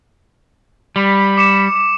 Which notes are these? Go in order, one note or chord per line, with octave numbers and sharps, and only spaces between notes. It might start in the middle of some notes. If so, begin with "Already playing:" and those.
G3 B5
D6 C#7 E7